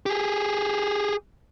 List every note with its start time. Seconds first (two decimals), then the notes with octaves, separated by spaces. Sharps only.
0.06 G4 G#4